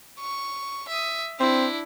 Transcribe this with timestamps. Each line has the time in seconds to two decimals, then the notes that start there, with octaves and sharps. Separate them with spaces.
0.20 C#6
0.88 E5 D#6
1.40 C4 D4 E4